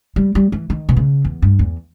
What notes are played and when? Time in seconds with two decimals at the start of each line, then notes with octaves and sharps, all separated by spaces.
0.16 G3
0.35 G3
0.52 E3
0.70 D#3
0.89 B2
0.97 C#3
1.25 E2
1.42 G2
1.59 E2